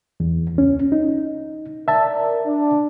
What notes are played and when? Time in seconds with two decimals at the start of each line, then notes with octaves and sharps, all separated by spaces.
0.20 E2
0.56 C#2 C#4
0.92 D#4
1.88 A#4 D5 E5 A5
2.45 D4